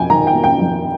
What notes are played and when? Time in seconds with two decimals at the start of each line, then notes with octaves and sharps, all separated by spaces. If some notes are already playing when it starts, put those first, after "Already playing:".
Already playing: F2 G5 G#5
0.10 D#3 A#5
0.27 G5
0.35 A#3
0.44 G5
0.61 F2